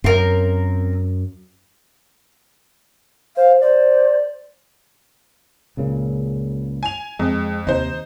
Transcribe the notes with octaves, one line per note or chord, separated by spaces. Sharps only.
F#2 C4 A#4
C5 F5
C5 D5
C#2 A#2 C#3
G#5 F7
F2 G#3
D#2 C3 D#4 C5